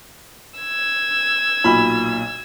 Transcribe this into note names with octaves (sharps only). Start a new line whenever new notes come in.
E6 G#6
B1 A#2 B5